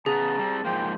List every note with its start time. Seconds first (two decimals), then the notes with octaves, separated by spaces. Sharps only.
0.06 C#3 B3 G#4 A5 A#5
0.39 G3 C4
0.65 G#2 F3 A#3 C5 G5